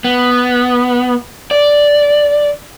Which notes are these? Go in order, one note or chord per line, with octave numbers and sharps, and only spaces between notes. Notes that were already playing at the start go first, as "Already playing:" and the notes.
B3
D5